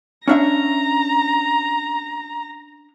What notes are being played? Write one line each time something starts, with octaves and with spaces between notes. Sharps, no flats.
C#4 D4 E5 A#5